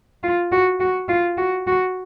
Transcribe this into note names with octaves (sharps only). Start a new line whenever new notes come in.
F4
F#4
F#4
F4
F#4
F#4